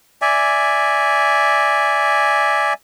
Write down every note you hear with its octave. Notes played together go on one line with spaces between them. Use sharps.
D5 E5 G#5